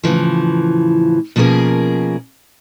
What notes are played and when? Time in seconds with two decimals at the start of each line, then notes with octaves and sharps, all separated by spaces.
0.04 A2 C#3 E3 F3
1.36 B2 F3 A#3 C#4 G#4 A#4